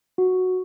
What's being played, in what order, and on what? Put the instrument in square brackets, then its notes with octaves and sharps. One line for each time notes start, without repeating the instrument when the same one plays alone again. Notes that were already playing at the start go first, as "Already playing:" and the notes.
[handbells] F#4